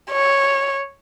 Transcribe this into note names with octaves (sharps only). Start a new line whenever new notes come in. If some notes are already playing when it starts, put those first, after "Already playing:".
C#5